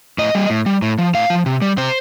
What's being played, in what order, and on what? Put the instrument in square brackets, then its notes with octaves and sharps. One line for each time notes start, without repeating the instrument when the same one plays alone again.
[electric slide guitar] A2 D#5
G3
A2
G3
A2
F3
A2 F5
F3
C3
G3
C3 C5